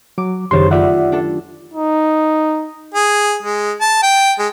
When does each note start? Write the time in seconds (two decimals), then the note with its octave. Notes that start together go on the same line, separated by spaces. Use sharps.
0.18 F#3 D6
0.51 F#1 D#3 G4 C5 C#5 C6 A6
0.71 A3 F4 G4 D5 E5 F#5
1.12 D4 A4
1.74 D#4
2.94 G#4
3.43 G#3
3.81 A5
4.03 G5
4.39 G#3